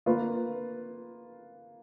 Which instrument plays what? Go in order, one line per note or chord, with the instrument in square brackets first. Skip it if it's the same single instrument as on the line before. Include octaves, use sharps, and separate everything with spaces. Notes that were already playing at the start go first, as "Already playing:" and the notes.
[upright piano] A#3 F4 B4